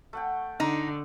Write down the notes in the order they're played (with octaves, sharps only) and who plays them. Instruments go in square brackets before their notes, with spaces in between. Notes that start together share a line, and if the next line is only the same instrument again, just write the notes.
[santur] A3 F#5 G5
[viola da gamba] D3 [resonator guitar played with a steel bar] D#4